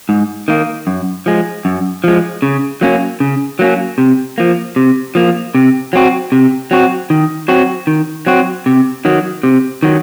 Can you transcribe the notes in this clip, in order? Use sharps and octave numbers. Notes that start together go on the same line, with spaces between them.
G#2
D#3 A#3
F#2
F3 G#3
F#2
F3 G#3
C#3
F#3 A#3 C#4
C#3
F#3 A#3 C#4
C3
F3 A#3
C3
F3 A#3
C3
F#3 C4 F#4
C3
F#3 C4 F#4
D#3
F#3 C4 F#4
D#3
F#3 C4 F#4
C3
D#3 F#3
C3
D#3 F#3